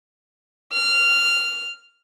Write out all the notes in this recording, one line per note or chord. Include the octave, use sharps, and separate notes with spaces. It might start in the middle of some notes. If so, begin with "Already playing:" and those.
F6